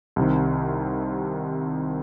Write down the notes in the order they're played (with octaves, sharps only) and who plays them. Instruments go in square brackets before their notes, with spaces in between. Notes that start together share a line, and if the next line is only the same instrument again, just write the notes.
[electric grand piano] C2 C3 D#3